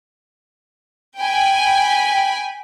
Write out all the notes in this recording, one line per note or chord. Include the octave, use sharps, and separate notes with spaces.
G5 G#5 B5